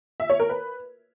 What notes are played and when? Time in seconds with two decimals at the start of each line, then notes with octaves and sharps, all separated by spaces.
0.20 E5
0.30 C#5
0.40 A#4
0.49 B4